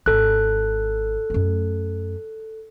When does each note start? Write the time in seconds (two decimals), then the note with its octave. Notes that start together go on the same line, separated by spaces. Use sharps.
0.06 G#1 A4 F#6
1.30 F#2 A3